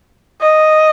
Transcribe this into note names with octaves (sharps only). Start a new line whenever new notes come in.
D#5